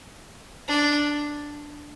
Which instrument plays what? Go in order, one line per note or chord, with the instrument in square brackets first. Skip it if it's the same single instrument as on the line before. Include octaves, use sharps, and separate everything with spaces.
[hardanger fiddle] D4